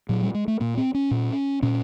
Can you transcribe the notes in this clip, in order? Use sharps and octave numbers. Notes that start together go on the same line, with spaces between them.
A#2 F#3
G3
G#3
A3
A#2 A#3
C4
C#4
A#2
A#2 C#4